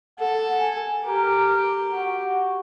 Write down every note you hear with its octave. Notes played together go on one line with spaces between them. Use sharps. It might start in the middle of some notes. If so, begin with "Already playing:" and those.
A4 F#5
G#5
G4 A#4
F#4